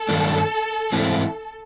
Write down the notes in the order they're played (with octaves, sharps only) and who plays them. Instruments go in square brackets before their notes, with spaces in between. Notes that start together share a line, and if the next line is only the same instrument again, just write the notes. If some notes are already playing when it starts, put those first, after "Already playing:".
Already playing: [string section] A4
[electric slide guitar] G2 D#3 F#3 A#3 D4
G#2 E3 G3 C4 E4